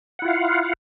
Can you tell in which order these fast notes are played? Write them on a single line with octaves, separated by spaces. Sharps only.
F#5 E4 F4 F5